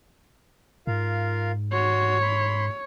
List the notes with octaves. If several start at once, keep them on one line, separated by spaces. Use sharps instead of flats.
G#2 F4 A#4 F5
F#4 C#5 C6
B5 C6